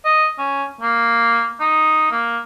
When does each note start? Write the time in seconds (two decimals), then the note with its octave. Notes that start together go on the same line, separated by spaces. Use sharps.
0.05 D#5
0.38 C#4
0.81 A#3
1.60 D#4
2.12 A#3